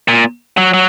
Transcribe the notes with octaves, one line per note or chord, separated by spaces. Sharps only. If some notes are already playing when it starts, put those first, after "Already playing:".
A#2
F#3
F#3